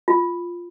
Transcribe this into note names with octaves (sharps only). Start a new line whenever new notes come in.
F4